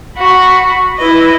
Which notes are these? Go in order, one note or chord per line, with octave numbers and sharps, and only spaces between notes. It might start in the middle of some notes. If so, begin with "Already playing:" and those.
F#4 B5
E4 B4 D#5